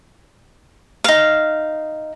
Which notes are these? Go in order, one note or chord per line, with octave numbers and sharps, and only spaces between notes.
D#4 F5